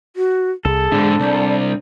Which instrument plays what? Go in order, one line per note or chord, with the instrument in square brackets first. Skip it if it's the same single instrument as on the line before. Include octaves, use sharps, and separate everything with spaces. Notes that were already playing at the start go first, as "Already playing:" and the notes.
[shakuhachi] F#4
[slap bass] C2 [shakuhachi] G#4 [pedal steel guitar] A4
[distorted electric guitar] G#2 D3 [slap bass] D4
[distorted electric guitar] C2 [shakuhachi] D5